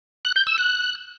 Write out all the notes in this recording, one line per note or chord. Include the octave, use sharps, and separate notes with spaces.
F#6
G6
E6
F#6